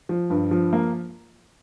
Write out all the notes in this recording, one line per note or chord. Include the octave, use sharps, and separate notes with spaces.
F3
G2
F3
A#3